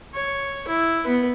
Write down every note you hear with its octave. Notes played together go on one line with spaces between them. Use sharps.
C#5
E4
B3 B4